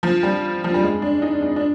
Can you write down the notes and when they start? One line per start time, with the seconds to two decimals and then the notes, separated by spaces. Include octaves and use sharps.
0.03 F3
0.23 G3
0.64 F3
0.74 G3
0.83 G#3
1.02 D4
1.22 D#4
1.42 D4
1.56 D4